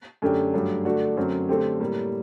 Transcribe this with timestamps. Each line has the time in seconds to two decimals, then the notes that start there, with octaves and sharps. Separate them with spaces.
0.22 F#2 D3 A3 D4 G4
0.54 G2 F#3 A3 D4 G4
0.85 D3 A3 D4 F#4
1.17 F#2 D3 F#3 C4
1.49 D3 A3 C4 G4
1.80 A2 G3 A#3